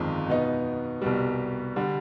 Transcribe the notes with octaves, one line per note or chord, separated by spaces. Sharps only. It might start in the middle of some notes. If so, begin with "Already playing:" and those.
Already playing: G1 F2 D#3 G#3
B2 B3 D#4
C2 B2 G3
D3 G3